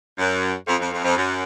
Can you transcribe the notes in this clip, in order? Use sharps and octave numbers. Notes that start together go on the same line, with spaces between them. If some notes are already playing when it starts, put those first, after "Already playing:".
F#2
F2
F2
F2
F2
F#2